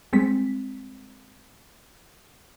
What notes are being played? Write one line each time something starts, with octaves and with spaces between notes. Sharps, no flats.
G3 G#3 C4 B6